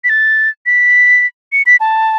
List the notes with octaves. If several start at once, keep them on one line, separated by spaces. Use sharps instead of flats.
B6
A6
B6
C#7
B6
A5